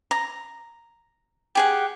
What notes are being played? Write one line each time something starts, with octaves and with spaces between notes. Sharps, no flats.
A#5
G4 G#4 F#5